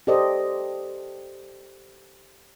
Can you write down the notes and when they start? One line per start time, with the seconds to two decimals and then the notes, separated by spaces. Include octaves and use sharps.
0.07 G4 A4 C5 D5 D#5